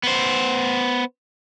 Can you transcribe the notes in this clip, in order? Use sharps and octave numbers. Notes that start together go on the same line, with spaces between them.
B3 C5